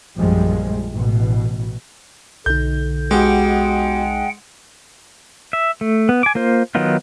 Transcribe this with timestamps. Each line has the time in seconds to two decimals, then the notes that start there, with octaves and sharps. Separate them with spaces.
0.17 A#1 F#2 F3 G3 G#3
0.93 A1 B2
2.46 B1 D3 D#4 G6
3.11 B2 G#3 G4 F#5 G5
5.53 E5
5.81 A3
6.09 B3
6.23 G#5 D6
6.35 A#3 F4 C5
6.75 D#3 F#3 B3 D#4 F4